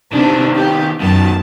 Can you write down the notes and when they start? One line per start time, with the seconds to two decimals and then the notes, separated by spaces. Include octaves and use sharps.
0.13 C3 D#3 B3 D4
0.56 G4
1.00 F#2 B2 D#3 A5